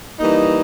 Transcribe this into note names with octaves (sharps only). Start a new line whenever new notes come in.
E3 G3 A#3 D#4